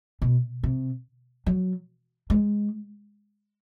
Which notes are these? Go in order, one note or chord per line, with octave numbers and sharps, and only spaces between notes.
B2
C3
F#3
G#3